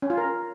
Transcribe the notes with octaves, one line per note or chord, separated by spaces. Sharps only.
C#4
F4
A#4